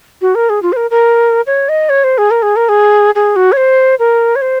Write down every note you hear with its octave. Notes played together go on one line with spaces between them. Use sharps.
F#4
A#4
G#4
F4
C5
A#4
A#4
C#5
D#5
C#5
C5
G#4
A#4
G#4
A#4
G#4
G#4
F#4
C#5
C5
A#4
C#5
C5